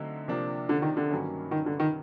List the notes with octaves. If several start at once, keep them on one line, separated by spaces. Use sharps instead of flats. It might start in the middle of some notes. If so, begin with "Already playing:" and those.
Already playing: D3 F#3 A3 C4 D#4
C3 F3 A#3 D4
D3
D#3
D3
G2 D#3 F#3 A#3 C#4
D#3
D3
D#3